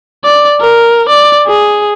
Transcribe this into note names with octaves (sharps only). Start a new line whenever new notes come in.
D5
A#4
D5
G#4